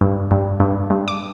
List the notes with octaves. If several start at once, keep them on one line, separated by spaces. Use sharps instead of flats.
G2
G2
G2
G2
D6